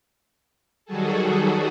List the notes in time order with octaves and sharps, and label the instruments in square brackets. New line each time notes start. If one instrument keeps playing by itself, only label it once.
[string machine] D#3 F#3 G3 F#4 G#4 A4